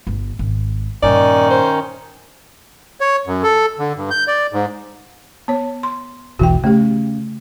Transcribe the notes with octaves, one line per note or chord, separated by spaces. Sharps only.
G1
G#1
G2 A#2 D#3 C#4 D#4 D5
C5
C#5
F#2
A4
D3
G2
G6
D5
G#2
B3 C#5
C6
E1 B1 E3 F#4 G5
C#3 A3 G4